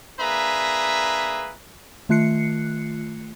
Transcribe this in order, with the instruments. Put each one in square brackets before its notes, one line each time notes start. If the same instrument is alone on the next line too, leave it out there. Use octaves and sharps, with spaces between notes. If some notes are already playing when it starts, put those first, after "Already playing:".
[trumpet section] A#3 D4 G#4 B4 E5 A#5
[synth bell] D#3 A3 F4 F#6 C7 C#7